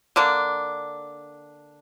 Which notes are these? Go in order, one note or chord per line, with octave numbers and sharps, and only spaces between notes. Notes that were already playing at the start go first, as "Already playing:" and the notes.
D3 A#3 D4